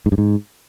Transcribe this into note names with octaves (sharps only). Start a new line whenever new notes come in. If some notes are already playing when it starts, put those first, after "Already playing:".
G#2
G2
G#2